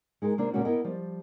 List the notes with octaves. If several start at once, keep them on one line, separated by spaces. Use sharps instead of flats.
G#3 D#4 G#4 A#4
C3 A#3 D4 F4
A#2 C#3 A3 A#3 C#4 F#4
B3 E4 A#4 D#5 G5
F3 G3